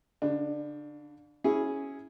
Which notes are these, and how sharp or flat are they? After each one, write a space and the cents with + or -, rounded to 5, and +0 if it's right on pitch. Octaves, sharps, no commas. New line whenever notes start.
D3 -45 D4 +20
C#4 +0 E4 -10 G#4 +0